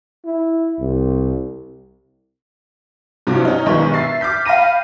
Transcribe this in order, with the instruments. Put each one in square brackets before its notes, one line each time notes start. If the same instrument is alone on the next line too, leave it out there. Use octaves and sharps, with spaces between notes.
[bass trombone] E4
C2
[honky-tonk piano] G2 C3 F3 F#3
C#4 D#4
B1 G2 D#3 G#3 B4 C#6
E5 A6 C7
D6 F6 G6 B6
F5 G5 B5 A#6 D#7